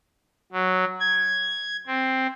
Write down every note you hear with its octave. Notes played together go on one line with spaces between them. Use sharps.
F#3
G#6
C4